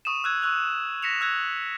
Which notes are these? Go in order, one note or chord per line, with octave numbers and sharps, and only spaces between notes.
C#6 D#6 D#7 E7
E6 F#6 G#6
C#6 E6 F#6 F7
A#6 B6 C#7 E7 F7
E6 F#6 G#6 F7